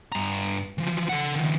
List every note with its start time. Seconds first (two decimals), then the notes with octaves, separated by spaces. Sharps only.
0.12 G2 A#5
0.78 E3 F3
1.09 A4 F#5
1.36 D#3 F3